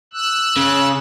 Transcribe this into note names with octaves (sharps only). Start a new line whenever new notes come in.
E6 F#6
C#3